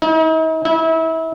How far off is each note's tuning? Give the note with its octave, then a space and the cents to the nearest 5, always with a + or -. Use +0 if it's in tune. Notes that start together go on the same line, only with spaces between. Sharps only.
D#4 +45
E4 -30